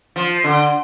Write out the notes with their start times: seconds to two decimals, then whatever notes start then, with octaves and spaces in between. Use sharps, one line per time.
0.16 F3
0.44 D3